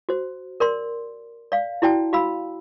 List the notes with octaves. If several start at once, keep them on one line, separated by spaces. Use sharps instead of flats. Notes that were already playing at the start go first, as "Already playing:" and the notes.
F#4 C5
A#4 D5 C6
D5 F5
E4 F#4 D5 G5 A5
F#4 F5 B5 E6